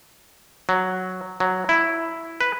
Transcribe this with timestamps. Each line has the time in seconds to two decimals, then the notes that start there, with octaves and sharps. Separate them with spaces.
0.69 F#3
1.40 F#3
1.69 E4
2.41 B4